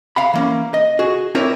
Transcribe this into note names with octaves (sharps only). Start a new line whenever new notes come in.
F5 F#5 B5
E3 A#3 C#4
D#5
F#4 G#4
C4 E4 A#4 B4 C#5 D5